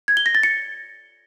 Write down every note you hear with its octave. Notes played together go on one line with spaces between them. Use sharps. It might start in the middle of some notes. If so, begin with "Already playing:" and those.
G#6
G7
A#6
A6
C#7